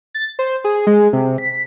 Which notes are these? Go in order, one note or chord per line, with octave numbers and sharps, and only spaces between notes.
A6
C5
G#4
G#3
C3
B6